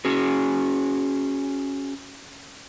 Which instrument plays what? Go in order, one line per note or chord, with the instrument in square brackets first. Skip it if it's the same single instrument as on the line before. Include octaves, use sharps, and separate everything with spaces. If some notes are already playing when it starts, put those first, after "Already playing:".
[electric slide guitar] C#4 F#4 G#4